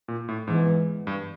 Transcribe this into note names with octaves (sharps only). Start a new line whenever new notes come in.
A#2
A2
G#2 E3 G#3 B3
G2